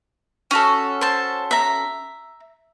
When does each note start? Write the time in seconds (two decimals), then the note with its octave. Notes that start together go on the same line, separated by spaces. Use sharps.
0.51 C#4 F#4 A4
1.01 C5 A5
1.51 E5 A#5